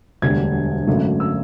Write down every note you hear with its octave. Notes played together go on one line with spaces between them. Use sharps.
E1 D2 D3 G3 G#6
G#1 F#2 D3 F#3 A3
E6